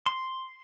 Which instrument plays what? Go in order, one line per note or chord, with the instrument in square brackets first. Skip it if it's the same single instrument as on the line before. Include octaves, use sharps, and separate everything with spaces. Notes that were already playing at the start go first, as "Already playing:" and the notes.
[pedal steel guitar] C6